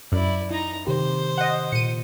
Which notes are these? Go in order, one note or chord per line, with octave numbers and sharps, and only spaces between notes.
F#2 E4 D5
D#4 E4 A#5
C3 D#3 G4 C5
D#5 F#5
A#2 C#7 D#7